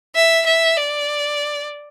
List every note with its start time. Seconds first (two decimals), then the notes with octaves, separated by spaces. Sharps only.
0.15 E5
0.46 E5
0.78 D5